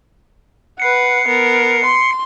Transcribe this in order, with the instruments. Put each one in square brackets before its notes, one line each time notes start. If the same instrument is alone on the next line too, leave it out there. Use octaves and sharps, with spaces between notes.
[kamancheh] B4 F#5 [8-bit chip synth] C7 C#7
[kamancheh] B3 A#4
C6